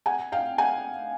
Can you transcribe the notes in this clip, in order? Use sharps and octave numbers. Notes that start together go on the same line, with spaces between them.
F#5 G#5
F5 G5
F#5 G#5